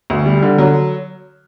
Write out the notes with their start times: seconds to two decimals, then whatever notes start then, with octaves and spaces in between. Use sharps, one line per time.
0.10 D2
0.26 G3
0.42 D3
0.58 F#3